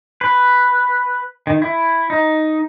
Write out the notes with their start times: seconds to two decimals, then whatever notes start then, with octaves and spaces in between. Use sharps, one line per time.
0.21 B4
1.47 D#3
1.62 E4
2.10 D#4